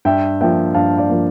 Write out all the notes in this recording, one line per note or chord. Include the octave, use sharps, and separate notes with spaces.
G2 E5 G5
F3 A#3 E5 G5
G2 F5 A5
D5 F5
F3 A#3